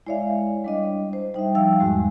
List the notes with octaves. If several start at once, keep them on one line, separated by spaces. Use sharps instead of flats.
G#3 E4 C#5 D5 E5 F5
G3 D4 D#5
C5
G3 D#4 E5 G5
F3 F5 G5 E6
E2 G#2 G#3 F#4